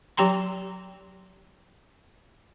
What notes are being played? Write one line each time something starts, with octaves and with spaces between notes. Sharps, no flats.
F#3 G4 G5 A#5 C6